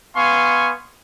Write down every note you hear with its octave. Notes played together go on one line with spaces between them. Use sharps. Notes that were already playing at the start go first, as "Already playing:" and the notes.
B3 F5 G#5 C6 C#6